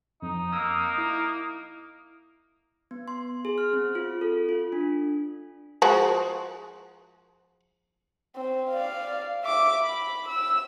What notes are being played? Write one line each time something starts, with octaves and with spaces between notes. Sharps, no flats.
F2 D#4
A#3 D#6 E6
E4
B3
C6
G#4
F6
C4
F4
A4
F4
D4
F3 G#3 F#4
C4
D5 F5
E5 D6
B5
E6